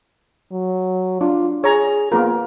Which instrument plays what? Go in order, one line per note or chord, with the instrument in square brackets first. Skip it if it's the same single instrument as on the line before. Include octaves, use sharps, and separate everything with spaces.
[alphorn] F#3
[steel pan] D4 [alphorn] F4
[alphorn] G#4 [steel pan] C#5 A#5
[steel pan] A#3 B3 A#4 [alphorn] F4